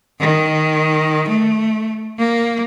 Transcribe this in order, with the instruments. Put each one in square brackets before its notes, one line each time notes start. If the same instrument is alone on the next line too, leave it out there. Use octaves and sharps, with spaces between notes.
[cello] D#3
A3
A#3